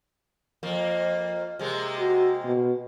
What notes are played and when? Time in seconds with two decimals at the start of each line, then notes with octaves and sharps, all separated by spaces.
0.63 F2 A#3
1.59 C3 G#3 A#3
1.99 F#4
2.45 B2